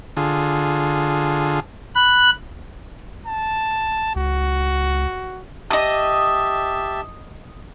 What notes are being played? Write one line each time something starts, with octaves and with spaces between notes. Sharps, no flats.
D3 F4 G#4
B5 F#6
A5
C#2 F#4
G4 D#5 E5 A5 D#6